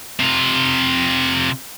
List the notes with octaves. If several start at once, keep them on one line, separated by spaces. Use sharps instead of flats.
C3 F4